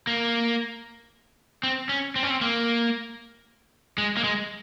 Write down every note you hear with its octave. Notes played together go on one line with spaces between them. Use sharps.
A#3
C4
C#4
C4
C#4
C4
A#3
G#3
A#3
G#3